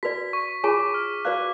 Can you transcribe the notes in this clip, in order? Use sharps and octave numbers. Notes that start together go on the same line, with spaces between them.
F#4 B4 D5 B6
C#6
F4 G#4 C#5 G#5 D6
F6
F#4 B4 D5 F5 F#6